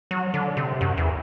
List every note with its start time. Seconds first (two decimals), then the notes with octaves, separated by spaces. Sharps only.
0.11 F#3
0.34 D3
0.57 C3
0.81 F#2
0.97 E2